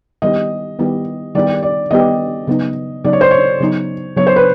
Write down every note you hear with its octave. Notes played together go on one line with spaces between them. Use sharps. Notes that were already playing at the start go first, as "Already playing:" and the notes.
D#3 G3 B3 E4 G4 D#5
D#3 G3 B3 E4 G4
D#3 G3 B3 E4 G4 D5
D5
D#3 G3 B3 E4 G4 D#5
C#3 F#3 B3 D#4
C#3 F#3 B3 D#4 D5
C#5
C5
C#5
C#3 F#3 B3 D#4
C#3 F#3 B3 D#4 C#5
C5
B4